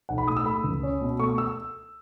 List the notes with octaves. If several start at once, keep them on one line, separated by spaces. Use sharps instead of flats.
B1 F#5
B5
A2 D#6
E6
A3 B5
C#2
C#4
B2
A3 C#6
E6